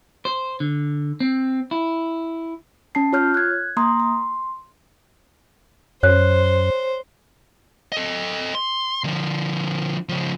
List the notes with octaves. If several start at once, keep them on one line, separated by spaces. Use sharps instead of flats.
C5
D3
C4
E4
C#4 A5 C7
F4 C#5 F6 G6
F#6 G#6
A#3 A#5 C6 D#6
C6
F#2 C5 C#5 F#6
A4 D#5
C6
D3 F3
C#3 F3